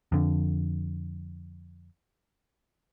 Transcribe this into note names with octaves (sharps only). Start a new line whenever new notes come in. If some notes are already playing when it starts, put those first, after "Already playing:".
F2 D3